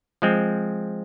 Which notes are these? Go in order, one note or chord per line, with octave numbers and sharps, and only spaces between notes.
F3 G#3 C4